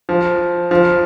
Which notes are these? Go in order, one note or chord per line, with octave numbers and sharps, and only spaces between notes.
F3
F3